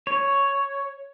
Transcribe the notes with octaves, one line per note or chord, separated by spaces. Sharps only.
C#5